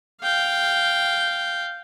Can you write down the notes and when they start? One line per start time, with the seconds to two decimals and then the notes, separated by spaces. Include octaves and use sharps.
0.22 F5 G5